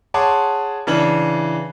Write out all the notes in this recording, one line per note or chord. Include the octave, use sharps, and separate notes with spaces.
G#4 C#5 F#5 A5 C6 D6
C#3 E3 D4 F#7